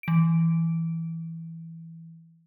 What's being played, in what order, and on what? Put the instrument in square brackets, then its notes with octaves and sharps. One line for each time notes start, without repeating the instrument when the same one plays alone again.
[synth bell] E3 D7